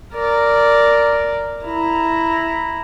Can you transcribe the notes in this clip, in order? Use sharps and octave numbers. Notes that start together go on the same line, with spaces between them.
A#4 D5
E4 A#5